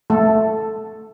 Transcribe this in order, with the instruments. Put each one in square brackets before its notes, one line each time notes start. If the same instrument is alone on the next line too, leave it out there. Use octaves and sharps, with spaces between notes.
[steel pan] A3 A4